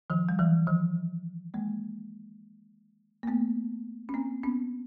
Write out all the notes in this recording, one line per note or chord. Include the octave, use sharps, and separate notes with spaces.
D#3 F3
G3
E3 F#3
D#3 F3
G#3 A#3
A#3
A3 B3
C#4
A#3 C4
B3 C#4